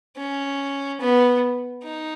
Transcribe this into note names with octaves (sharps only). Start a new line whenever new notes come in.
C#4
B3
D#4